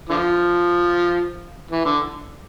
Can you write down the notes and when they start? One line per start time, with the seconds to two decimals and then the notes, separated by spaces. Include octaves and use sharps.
0.09 D3 F3
1.71 E3
1.85 D3